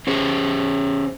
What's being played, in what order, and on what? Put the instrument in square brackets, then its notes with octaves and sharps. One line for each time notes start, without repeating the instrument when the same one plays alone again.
[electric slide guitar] C#4 G#4 C5